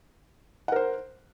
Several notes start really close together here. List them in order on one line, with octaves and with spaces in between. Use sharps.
F#5 A#4 C5